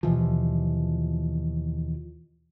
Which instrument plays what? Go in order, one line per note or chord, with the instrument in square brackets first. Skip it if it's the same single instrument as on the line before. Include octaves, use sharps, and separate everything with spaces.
[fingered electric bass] D#2 B2 E3 F3